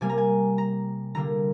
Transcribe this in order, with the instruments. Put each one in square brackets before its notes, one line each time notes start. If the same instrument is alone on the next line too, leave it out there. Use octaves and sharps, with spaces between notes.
[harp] C3 G3 A#3 G#5
A#5
G#5
A#5
D3 G3 A#3 A#5